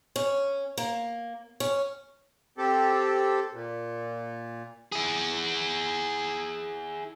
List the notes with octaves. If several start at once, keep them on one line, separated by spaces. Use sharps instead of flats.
C#4
A#3
C#4
C4 G4 A4
A#2
E4 G#4